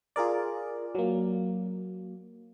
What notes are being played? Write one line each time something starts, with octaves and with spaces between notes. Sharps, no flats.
F4 G#4 A#4 D5
F#3 A#3